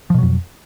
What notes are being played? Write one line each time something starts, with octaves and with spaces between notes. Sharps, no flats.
F2 B2 F3 F#3